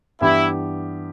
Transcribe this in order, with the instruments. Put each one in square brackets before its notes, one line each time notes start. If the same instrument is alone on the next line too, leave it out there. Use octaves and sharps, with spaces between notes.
[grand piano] G2 E3 B3 G4 [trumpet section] E4